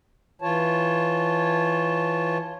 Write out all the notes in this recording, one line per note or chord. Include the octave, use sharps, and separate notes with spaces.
E3 F4 C#5 A5